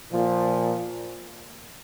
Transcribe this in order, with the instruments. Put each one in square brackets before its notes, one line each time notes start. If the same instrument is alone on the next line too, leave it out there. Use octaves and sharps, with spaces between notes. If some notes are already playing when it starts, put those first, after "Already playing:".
[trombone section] A#2 F3